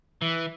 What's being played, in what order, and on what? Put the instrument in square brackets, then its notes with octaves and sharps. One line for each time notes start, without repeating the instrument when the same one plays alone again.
[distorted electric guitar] E3